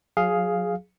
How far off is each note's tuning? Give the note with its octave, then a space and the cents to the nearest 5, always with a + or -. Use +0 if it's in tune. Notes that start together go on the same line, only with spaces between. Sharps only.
F#3 -30 G#4 +5 F5 +0